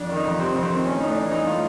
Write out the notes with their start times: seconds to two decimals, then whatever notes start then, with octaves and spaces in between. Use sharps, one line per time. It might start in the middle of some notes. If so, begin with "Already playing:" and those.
Already playing: F2 D4
0.09 D#3
0.16 D#4
0.24 F2
0.40 C3 C4
0.56 F2
0.63 C4
0.71 D#3
0.86 A2 C#4
1.00 A2 D#4
1.08 D4
1.15 E3
1.31 E3 D#4
1.46 A2 F4